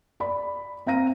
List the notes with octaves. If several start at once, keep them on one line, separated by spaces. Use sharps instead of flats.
D5 B5
C4 F5 A#5 A#6 D#7